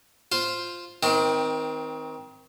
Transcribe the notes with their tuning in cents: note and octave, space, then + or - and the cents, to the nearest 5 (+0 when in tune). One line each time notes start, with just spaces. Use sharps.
F4 +0 C5 +0
D#3 +30 C4 +0 D#5 -30